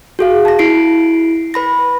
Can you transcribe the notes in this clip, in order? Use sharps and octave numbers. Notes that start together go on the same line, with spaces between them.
F#4 G#4 F5
A5 A#6
E4 C7 D7
B4 B5 A#6